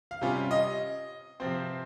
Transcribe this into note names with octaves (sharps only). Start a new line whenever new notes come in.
F5
C3 G3 C#4 F4
D#5
C3 F3 C4 C5